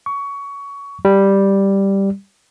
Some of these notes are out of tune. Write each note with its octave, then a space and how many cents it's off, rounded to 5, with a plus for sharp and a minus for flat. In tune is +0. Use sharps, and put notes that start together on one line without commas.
C#6 +20
G3 +0